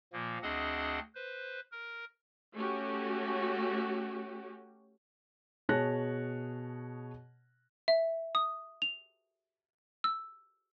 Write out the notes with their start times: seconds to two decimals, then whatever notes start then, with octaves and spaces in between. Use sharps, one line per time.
0.13 A#2 F3 A#3
0.42 D2 C4 D4 G#4 D#5 F#5
1.15 B4 C5
1.72 A#4
2.55 A3 C#4 F#4 G4
5.69 B2 G#4 C#5 A5 F#6 A#6
7.88 E5
8.35 D#6
8.82 F7
10.04 E6